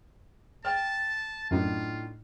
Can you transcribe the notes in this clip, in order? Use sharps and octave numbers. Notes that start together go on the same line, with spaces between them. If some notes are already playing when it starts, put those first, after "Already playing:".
G5 A5 F6
F#2 A2 D4 D#4 F4